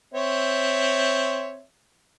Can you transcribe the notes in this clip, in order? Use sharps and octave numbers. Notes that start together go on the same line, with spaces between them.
C4 C#5 E5